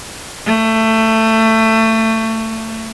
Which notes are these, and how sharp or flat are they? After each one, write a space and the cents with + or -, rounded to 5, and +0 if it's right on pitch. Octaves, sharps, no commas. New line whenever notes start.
A3 +20